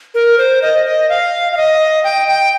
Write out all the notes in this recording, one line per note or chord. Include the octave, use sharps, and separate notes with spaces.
A#4
C5
D#5
D#5
F5
F5
D#5
G5
G5